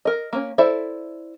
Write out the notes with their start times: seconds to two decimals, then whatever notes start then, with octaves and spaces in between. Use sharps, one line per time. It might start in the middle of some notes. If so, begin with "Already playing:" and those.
0.05 A#4 D#5
0.33 A#3 C4 C#4
0.58 E4 A4 C5 D5 E5